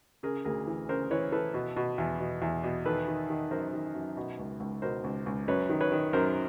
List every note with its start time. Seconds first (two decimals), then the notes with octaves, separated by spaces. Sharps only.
0.23 C#3 G#4 A#4
0.45 D2 G#4 A#4
0.67 E3
0.89 C#3 A#4 C5
1.11 E3 B4 C#5
1.32 E3 A4 B4
1.54 B2
1.76 B2
1.98 E2
2.20 B2
2.42 E2
2.63 B2
2.85 D#3 A4 B4
3.08 D#3
3.30 D#3
3.51 F#2 A#4 C5
3.73 D#3
3.95 F#2
4.17 B2
4.39 C#2
4.60 C#2
4.82 B2 A#4 C5
5.04 C#2
5.26 C#2
5.48 F#2 B4 C#5
5.69 D#3
5.81 B4 C#5
5.92 D#3
6.13 F#2 A#4 C5